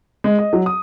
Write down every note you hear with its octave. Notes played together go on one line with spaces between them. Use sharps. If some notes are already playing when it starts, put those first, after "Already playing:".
G#3
D#5
F#3
D#6